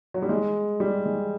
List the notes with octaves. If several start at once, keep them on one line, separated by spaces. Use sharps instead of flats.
F#3
G3
G#3
G3
G#3